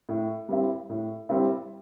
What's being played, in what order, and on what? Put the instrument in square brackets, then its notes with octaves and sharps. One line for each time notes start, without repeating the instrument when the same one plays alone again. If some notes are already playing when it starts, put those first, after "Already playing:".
[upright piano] A2
G3 C4 E4
A2
G3 C4 E4